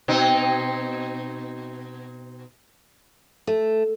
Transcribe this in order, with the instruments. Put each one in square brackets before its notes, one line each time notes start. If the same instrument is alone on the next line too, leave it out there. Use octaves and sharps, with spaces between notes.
[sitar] B2 C4 D#4
[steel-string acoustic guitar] A3